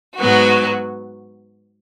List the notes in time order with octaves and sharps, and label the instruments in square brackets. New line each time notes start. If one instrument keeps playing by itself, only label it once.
[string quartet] G#2 F#3 B3 F#4